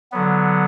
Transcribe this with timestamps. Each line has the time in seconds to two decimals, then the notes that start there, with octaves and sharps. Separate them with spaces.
0.12 D3 F#3 B3